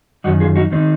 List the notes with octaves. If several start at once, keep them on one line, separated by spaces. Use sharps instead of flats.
F#2 D#3 D#4 F#4
F4 G#4
D#4 F#4
D#3 C4 D#4